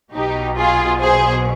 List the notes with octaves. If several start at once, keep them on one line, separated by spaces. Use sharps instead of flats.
B1 B2 D#4 G4
F4 G#4
G#4 C5